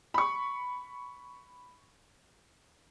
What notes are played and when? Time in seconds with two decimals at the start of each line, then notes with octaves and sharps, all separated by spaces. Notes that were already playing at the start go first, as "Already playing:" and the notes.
0.14 B5 C#6